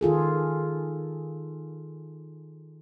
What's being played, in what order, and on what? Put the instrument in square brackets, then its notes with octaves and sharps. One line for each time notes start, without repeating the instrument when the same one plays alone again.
[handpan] D#3 F4 G#4 A4